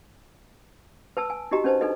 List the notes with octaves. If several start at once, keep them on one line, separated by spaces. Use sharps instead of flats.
B4 A5 E6
G#5
D#4 F#4 G4 D#5 A#5
C#4 D4 B4 C5 D#5 A5
D4 D#4 A4 B4 D#5